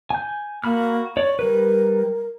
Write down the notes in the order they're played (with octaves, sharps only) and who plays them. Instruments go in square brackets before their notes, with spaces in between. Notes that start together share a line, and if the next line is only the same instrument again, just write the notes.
[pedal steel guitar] G#5 G6
[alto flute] A#3 [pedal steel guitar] F#4 B5 F6
[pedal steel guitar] C#5 D5 [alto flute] C#6
[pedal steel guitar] G3 B4 [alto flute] A#4